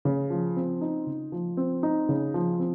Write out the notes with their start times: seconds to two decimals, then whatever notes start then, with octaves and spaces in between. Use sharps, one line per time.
0.05 C#3
0.30 F3
0.57 C4
0.81 D#4
1.07 C#3
1.32 F3
1.57 C4
1.83 D#4
2.09 C#3
2.34 F3
2.60 C4